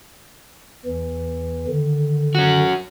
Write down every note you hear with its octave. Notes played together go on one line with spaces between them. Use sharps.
E2 E3
D3 D#3
C#4 F#4